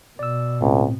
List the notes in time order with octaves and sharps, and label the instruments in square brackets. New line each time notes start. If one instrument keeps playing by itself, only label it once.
[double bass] B2 [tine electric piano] D5 E6
[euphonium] C#2 [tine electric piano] A2 C4